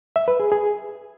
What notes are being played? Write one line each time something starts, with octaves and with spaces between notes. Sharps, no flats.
E5
B4
G#4
G#4